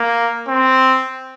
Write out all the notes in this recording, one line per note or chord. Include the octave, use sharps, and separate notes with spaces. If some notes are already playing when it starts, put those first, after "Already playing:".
Already playing: A#3
C4